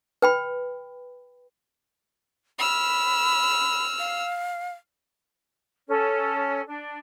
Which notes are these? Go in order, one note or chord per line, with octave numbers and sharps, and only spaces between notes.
B4 G5 B5
B5 E6 F6
F5
C#4 A4
D4